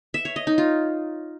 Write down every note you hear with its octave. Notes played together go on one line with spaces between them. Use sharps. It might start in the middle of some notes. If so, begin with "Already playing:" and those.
E5
C#5
D#5
D#4
F4